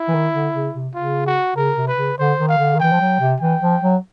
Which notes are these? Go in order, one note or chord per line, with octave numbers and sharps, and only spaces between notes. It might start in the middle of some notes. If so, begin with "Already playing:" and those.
Already playing: E4
E3
D#3
D3
C#3
C3
C#3 F4
F#4
C#3 A#4
C3
B4
C#3
D3 C5
D#3
F5
D3
D#3
E3 G5
F3
F#3
C3
E3 G5
F3
F#3